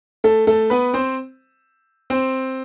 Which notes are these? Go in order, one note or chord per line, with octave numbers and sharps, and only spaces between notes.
A3 A4
A3 A4
B3 B4
C4 C5
C4 C5